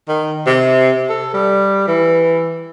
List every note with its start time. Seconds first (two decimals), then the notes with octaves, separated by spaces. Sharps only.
0.08 D#3
0.46 C3
1.09 A4
1.34 G3
1.87 E3